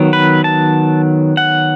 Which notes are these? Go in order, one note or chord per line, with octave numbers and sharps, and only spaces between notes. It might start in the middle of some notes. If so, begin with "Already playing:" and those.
Already playing: D#3 F#3 B3
B4
A5
F#5